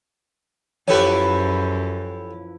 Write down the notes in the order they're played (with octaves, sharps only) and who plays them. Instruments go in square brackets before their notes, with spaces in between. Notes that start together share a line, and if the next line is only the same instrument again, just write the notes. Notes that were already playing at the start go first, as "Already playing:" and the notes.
[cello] F#2 [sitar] F3 E4 B4 [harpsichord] G4 A4 G#5 [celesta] C#5